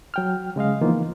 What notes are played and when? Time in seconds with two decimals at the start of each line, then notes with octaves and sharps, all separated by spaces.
0.14 F#3 G5 F6
0.56 C#3 G#3 D#5 F5
0.81 E3 F3 A#3 B3 D#4 F4